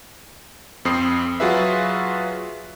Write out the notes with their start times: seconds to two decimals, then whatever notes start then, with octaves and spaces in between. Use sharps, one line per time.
0.85 F2 C4 D#6 C7
1.40 F#3 F4 F#4 G#4 B4 E5